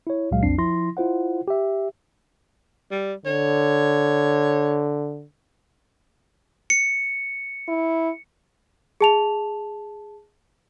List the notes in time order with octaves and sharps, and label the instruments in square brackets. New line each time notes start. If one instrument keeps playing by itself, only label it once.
[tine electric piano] E4 C#5
C#2 A#2 F#3 G#3 F5
B1 F2 C4 D4 C7
F3 E4 C6 A#6
E4 F4 C5 F#5
G4 E5
[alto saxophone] G3
[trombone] D3 [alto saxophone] C#5
[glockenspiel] C#7
[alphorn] E4
[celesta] G#4 A5 F7